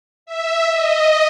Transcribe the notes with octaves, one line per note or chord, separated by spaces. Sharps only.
E5
D#5